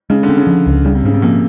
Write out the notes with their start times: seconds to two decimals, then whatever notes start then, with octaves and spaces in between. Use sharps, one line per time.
0.10 C#3 G#3
0.23 D3
0.29 C4
0.37 C#3
0.47 F3
0.66 C#2
0.85 C#3 G3
0.95 C3
1.04 G#2 C#3
1.14 C3
1.22 A#2 F3